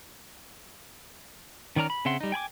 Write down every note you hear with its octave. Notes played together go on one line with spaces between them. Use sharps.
D#3 C#4 D5 A#5 F6
B5
C#3 C4 E5 F#5 C6
G3 D#4
G5 G#5 B5 D6